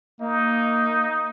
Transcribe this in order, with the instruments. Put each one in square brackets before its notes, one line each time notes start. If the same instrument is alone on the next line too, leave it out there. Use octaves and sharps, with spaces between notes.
[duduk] A#3 [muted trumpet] D#4